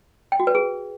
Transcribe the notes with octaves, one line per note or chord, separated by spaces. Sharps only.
G5
F#4
B4
G#4